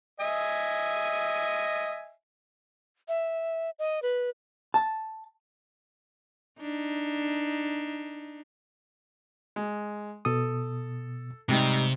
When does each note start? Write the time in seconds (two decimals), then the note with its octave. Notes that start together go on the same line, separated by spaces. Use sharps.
0.20 D#5 E5 G#5
3.08 E5
3.79 D#5
4.02 B4
4.74 A5
6.61 D4 D#4
9.56 G#3
10.25 B2 A4 D#6
11.49 G#2 C3 G3 D#4